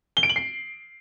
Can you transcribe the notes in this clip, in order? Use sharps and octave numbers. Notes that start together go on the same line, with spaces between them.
G7
D7
F#7
C7